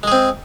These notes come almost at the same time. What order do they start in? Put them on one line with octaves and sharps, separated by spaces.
G#3 G#4 C4